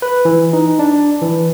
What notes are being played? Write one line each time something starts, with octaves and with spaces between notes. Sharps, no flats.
B4
E3
D#4
D4
E3